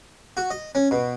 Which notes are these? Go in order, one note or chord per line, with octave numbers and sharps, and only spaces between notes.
F#4
D#5
C#4
B2